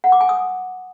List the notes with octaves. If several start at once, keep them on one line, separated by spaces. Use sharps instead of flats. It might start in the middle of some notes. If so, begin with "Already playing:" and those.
F#5
D6
G#5
D#6